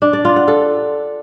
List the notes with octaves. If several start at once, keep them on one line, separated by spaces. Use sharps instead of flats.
D4
D5
F4
F#5
A4